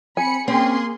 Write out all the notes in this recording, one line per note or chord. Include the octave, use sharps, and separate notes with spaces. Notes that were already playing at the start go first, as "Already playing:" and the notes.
C4 G#5 B5 C#7
A#3 C4 C#4 G#4 C#5 C6